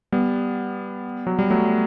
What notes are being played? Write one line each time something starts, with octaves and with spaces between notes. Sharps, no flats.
G3 B3
F#3
G3
F#3 A3